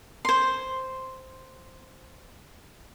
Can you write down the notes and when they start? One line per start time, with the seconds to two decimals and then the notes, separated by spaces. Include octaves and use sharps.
0.25 C5 C6